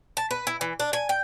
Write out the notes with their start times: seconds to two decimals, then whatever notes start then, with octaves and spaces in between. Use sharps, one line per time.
0.17 A5
0.31 B4
0.47 E4
0.61 E3
0.80 D4
0.93 G#5
1.09 G5